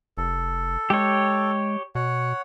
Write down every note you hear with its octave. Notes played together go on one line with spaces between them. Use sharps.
F1 A4
G#3 G4 C#5
B2 C#5 F#5